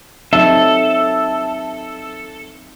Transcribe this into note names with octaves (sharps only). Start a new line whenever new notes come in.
F#3 C4 D#4 A4 E5